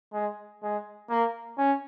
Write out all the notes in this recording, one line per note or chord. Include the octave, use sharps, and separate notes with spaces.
G#3
G#3
A#3
C#4